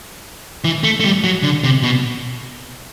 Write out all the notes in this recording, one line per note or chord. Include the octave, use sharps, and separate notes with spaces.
E3
A3
A3
G3
F#3
D3
C3
B2